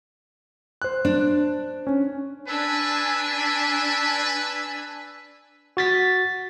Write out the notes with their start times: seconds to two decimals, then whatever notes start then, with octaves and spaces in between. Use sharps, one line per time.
0.82 C5 F#6
1.05 D4
1.87 C#4
2.48 D4 B4 G#5 E6
5.77 F#4 A6 B6